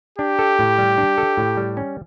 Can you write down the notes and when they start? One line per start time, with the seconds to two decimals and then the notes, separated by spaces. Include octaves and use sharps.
0.19 D4 G4
0.39 A4
0.59 A2
0.78 G3
0.98 D4
1.18 A4
1.37 A2
1.57 G3
1.77 C#4